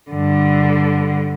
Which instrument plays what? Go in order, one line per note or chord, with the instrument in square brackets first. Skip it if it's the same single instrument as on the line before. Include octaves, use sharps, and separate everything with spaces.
[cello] G2 D3